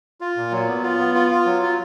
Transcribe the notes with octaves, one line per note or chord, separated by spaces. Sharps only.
F4
A#2
F#3
B3
F4
B3
F4
F4
F#3
F4